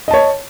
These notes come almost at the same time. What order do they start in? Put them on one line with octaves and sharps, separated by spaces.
D#5 A5 C#5